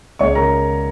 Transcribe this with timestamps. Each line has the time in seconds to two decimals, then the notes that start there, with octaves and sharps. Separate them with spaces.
0.19 C#2 C#5 C#6
0.35 C#3 A#4 A#5